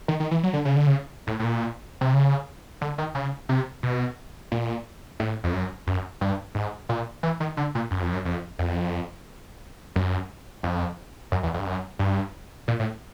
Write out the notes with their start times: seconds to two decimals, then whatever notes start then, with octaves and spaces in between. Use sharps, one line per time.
0.08 D#3
0.20 D#3
0.31 E3
0.43 F#3
0.53 D3
0.65 C#3
0.76 D3
0.87 C#3
1.27 A2
1.40 A2
1.44 A#2
2.01 C3
2.13 C#3
2.81 D3
2.98 D#3
3.15 C#3
3.49 C3
3.83 B2
4.52 A#2
5.20 A2
5.44 F2
5.53 F#2
5.87 F#2
6.21 G2
6.55 G#2
6.89 A#2
7.23 E3
7.40 D#3
7.57 D3
7.75 A#2
7.91 F#2
8.02 F2
8.13 F#2
8.25 F2
8.59 F2
9.96 F#2
10.63 F2
11.32 F#2
11.43 E2
11.54 F2
11.59 G2
11.66 F#2
11.99 G2
12.68 A#2
12.80 A2